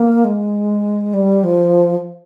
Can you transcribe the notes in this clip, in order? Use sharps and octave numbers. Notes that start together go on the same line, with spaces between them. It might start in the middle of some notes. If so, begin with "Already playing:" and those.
Already playing: A#3
G#3
G3
F3